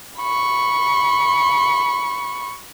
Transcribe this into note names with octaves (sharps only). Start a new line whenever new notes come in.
B5 C#6